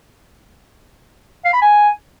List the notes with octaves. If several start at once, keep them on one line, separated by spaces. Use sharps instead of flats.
F5
B5
G#5